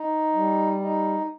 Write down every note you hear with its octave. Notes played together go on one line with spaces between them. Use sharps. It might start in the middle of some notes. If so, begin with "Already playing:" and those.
Already playing: D#4
G3
D#4